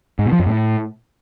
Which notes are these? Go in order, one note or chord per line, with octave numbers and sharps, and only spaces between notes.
G#2
B2
F3
F#2
A2